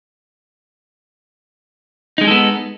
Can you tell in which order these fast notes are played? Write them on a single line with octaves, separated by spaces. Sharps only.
D#4 G#3 G#4 A4 B3